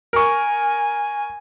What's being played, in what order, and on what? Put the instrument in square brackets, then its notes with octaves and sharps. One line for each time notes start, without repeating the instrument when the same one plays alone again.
[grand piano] A#4 C#6 [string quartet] G#5